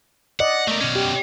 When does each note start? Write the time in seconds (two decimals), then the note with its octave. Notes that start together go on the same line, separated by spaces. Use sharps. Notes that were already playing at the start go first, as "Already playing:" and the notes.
0.40 D5 D#5 F#5
0.68 A3 A#4
0.81 B2 C#4
0.95 G4